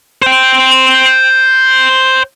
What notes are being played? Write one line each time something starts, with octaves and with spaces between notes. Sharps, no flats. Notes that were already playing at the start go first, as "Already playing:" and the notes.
C5 G5